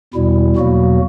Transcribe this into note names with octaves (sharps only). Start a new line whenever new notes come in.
E2 B2 G3 E4
E2 B2 F#3 A#3 F#4